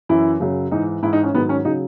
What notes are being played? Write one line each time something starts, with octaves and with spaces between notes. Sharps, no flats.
F#2 E3 E4
F#2 C#3 F#3
G#2 E3 D#4
G#2 E3 E4
D#4
C#4
G#2 D#3 F#3 B3
C#4
C#3 F#3 D#4